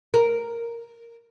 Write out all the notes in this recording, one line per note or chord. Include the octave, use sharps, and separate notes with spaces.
A#4